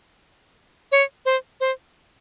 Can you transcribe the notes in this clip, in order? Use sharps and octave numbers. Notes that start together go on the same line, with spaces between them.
C#5
C5
C5